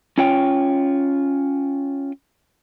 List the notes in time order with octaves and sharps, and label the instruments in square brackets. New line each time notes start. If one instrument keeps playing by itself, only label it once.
[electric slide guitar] C#4 F4 C#5 G5